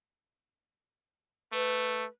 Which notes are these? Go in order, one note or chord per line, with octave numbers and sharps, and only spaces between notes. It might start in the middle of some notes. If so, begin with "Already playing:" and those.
A3 B4